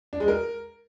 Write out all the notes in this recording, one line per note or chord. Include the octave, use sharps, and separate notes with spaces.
D4
G#3
A#4